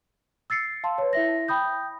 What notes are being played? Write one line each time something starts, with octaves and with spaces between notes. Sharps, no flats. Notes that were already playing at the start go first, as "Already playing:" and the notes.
E6 A6 C7 C#7
F5 A5 C6
B4 C#5
E4 E5 A#6
G5 B5 D#6 G6